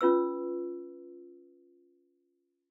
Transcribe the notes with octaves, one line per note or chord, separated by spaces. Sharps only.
C#4 F4 B4 E6